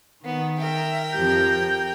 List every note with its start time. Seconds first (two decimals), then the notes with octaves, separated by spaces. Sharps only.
0.25 D#3 B3
0.59 A#4 E5 G5
1.12 F2 F3 G4 G6